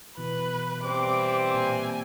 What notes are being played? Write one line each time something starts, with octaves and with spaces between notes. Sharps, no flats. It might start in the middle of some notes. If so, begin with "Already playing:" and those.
B2 E3 B4
E3 G3 C4 C5 D6
A#2 G#5